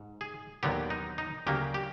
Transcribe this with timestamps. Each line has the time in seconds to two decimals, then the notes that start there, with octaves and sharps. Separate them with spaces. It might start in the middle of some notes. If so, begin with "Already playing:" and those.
Already playing: G#2
0.21 G#4
0.63 D#2 D3 F#3 B3 G4
0.90 D#4
1.18 D#4
1.47 D2 C#3 F#3 A#3 G4
1.74 G4